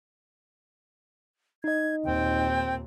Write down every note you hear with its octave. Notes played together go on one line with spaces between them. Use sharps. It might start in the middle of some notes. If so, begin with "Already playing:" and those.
D#4 D#5 G#6
D#2 A#2 C4 G5